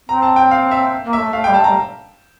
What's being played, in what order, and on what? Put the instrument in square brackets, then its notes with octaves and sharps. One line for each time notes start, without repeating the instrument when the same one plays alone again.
[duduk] C4 [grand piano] A#5
[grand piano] A5
G5
F5
E5
[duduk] A#3
[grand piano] E5
[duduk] A3
[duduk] A3 [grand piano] F5
[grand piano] G5
[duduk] G3
[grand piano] A5
[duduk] A3 [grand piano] A#5
[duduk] G3